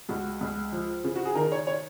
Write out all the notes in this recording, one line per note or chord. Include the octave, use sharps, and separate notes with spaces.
C#2 F#4
C#2
F3
C#3
F#4
G#4
D#3 A#4
C#5
C#5